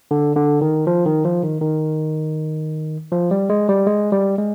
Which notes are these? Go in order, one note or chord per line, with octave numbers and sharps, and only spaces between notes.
D3
D3
D#3
F3
D#3
F3
D#3
D#3
F3
G3
G#3
G3
G#3
G3
G#3